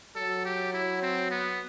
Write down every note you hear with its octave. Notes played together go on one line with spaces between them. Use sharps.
F#3 A4
G4
E4
C4
B3